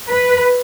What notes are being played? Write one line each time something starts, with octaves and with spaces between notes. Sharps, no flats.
B4